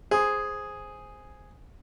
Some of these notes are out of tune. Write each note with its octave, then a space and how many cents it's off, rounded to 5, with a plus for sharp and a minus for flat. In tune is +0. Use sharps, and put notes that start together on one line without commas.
G#4 +0 C5 +0